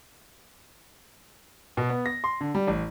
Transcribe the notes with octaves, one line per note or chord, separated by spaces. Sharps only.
B2
B3
A#6
C6
D3
G3
A1